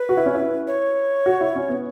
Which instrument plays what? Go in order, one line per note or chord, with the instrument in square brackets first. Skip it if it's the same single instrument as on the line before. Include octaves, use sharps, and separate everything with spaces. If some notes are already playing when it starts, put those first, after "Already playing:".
Already playing: [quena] B4
[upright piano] F#4
E4
C#4
E4
[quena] C#5
[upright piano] F#4
E4
C#4
B3